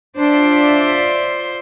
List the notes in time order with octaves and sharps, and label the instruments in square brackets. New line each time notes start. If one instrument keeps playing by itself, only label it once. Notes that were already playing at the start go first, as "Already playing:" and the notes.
[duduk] D4 [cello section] F4 D5 E5 [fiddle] C5 C6